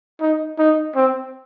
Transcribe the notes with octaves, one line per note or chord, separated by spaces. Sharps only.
D#4
D#4
C4